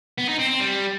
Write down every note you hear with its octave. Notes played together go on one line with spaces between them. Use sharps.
B3
D#4
C4
C4
G3